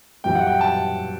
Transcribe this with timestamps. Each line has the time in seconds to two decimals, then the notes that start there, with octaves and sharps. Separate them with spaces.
0.24 F#2 E3 G3 G5
0.35 F#5
0.47 G5
0.61 A5